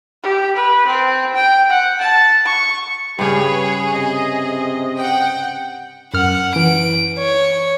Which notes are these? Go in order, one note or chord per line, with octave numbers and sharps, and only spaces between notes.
G4
B4
C4
G5
F#5
A5
C#6
G2 C#3 G4 G#4 B4 C#5
C3 D#5
F#5 G5
F#2 F#5 F6
E3 D7
C#5